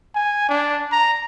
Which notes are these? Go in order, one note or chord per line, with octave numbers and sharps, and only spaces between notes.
G#5
D4
A#5